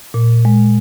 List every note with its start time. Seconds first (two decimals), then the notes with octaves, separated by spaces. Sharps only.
0.14 A#2
0.45 G#3